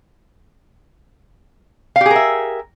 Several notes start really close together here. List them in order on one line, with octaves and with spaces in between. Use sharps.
F5 G4 G#4 A#4 E5